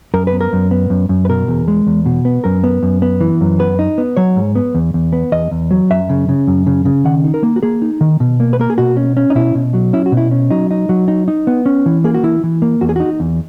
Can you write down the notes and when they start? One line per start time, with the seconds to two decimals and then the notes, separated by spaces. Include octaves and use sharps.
0.14 F#2 A#4
0.27 B4
0.32 B3
0.41 A#4
0.53 F#2
0.71 B3
0.90 F#2
1.09 F#2
1.25 B4
1.29 B2 A#4
1.48 E2
1.68 G#3
1.87 E2
2.06 B2
2.25 B3
2.44 F#2 A#4
2.64 B3
2.83 F#2
3.02 B3
3.21 E3
3.41 F#2
3.59 B3 B4
3.79 D#4
3.98 B3
4.17 F#3 C#5
4.36 G#2
4.56 B3
4.75 E2
4.94 E2
5.13 B3
5.32 E2 D#5
5.51 E2
5.71 F#3
5.90 F#2 E5
6.09 C#3
6.29 C#3
6.47 F#2
6.67 C#3
6.85 C#3
7.05 D#3 F#5
7.24 D#4
7.34 A#4
7.43 A#3
7.56 F#4
7.63 A#3 G#4
7.82 D#4
8.01 D#3
8.20 B2
8.40 A#3
8.53 B4
8.59 A#3 A#4
8.70 G#4
8.78 B2 F#4
8.97 C#4
9.17 C#4
9.30 D#4
9.35 B2 E4
9.55 B2
9.74 F#3
9.93 C#4 E4
10.06 F#4
10.12 B2
10.17 E4
10.31 C#4
10.51 F#3 D#4
10.71 D#4
10.89 F#3
11.08 D#4
11.28 D#4
11.47 B3
11.66 C#4
11.86 E3
12.04 A#3 G#4
12.14 F#4
12.23 E3 E4
12.43 E3
12.62 A#3
12.81 E2 F#4
12.89 G#4
12.96 D#4 F#4
13.20 E2